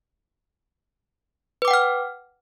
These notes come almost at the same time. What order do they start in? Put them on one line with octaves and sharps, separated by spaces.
B4 D6 G5 F#5 F6